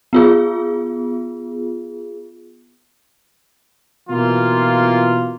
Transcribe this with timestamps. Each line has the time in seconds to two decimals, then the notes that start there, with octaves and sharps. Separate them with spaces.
0.13 B3 F4 G#4
4.10 B2 E3 A#3 F4